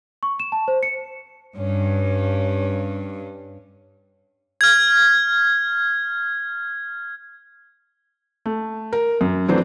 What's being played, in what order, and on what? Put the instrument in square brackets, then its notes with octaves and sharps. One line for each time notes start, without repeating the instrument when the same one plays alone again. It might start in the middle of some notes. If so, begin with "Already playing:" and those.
[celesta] C#6
E7
A5
C5
C#7
[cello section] G2 [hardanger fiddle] C#4
[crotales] F6 G#6
[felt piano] A3
A#4
F#2
E3 F#3 A3 C4 D4 C5